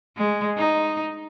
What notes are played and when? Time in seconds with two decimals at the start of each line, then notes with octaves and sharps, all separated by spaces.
0.17 G#3
0.57 D#4